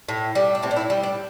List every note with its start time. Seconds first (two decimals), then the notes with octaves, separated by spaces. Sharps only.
0.08 A2
0.35 G3
0.55 D4
0.63 A2 C4
0.71 D4
0.76 E4
0.90 G3
1.03 D4